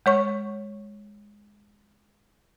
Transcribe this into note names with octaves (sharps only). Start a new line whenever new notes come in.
G#3 C#5 C#6